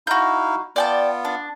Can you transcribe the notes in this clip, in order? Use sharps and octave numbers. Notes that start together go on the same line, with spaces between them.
D#4 E4 F#4 F5 G6
B3 F4 D5 G5 A5
D4